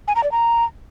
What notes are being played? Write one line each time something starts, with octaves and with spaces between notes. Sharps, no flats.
G#5
A#5
D5
A#5